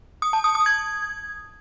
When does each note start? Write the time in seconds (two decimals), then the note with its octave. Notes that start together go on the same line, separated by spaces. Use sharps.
0.22 D#6
0.33 A5
0.44 D#6
0.55 D#6
0.66 G#6